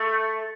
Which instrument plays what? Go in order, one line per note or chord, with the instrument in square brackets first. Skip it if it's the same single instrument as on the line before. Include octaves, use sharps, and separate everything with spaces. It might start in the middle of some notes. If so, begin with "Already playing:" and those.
Already playing: [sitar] A3